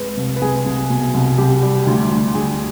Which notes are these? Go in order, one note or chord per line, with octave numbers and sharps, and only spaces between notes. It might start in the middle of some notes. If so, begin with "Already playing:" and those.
Already playing: F2 G#3 B4
C2
B4
C2 G#4
C2
B2
C2
C2 G4
G3
D2
D2
D2 G#4